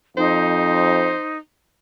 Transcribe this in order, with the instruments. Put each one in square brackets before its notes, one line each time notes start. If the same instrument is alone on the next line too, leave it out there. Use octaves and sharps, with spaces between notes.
[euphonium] F2 [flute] D#4 [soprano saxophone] C5